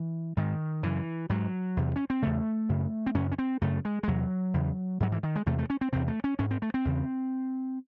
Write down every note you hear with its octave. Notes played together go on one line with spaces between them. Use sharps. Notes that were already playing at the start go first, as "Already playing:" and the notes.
Already playing: E3
G#2 D#3
F#2 C#3 E3
G#2 F#3
E2 C3
C#4
C4
E2 C#3 A3
F#2 C#3
C4
F#2 C#3 C#4
C#4
C4
F#2 C#3 A3
G#3
G#3
E2 C3 F#3
E2 C#3
G#2 F#3
E3
D#3
G#3
E2 C3 A3
A3
C#4
C4
E2 C3 C4
A3
C#4
G#2 C#4
C4
A3
C4
E2 C#3